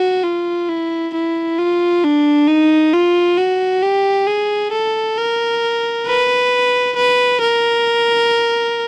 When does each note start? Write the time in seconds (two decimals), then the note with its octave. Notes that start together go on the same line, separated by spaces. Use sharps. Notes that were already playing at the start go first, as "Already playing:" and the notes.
Already playing: F#4
0.23 F4
0.68 E4
1.14 E4
1.58 F4
2.04 D4
2.47 D#4
2.93 F4
3.38 F#4
3.82 G4
4.27 G#4
4.72 A4
5.18 A#4
6.07 B4
6.96 B4
7.41 A#4